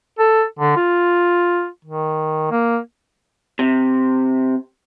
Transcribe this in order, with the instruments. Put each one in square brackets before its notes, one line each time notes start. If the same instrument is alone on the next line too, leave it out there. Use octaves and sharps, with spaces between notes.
[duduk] A4
D3
F4
D#3
A#3
[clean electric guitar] C3